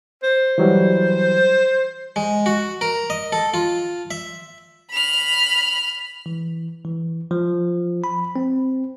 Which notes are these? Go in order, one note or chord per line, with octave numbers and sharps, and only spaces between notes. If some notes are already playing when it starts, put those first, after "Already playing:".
C5
E3 F#3 G3
G#3
F#4
A#4
D#5
A4
F4
E5
B5 F6
E3
E3
F3
B5
C4